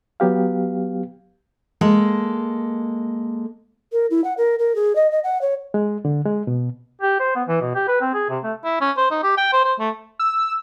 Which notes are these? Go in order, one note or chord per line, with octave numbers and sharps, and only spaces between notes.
F#3 B3 G4 F5
G#3 A#3 A4
A#4
E4
F#5
A#4
A#4
G#4
D#5
D#5
F#5
C#5
G#3
D3
G#3
B2
G4
C5
B3
E3
B2
G4
B4
C4
G#4
C3
A3
E4
C#4
C5
D#4
G4
G5
C5
C5
A3
E6